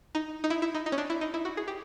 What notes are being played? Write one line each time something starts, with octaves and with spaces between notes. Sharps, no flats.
D#4
D#4
E4
E4
D#4
D#4
C#4
D4
E4
D#4
E4
F#4
G#4
G4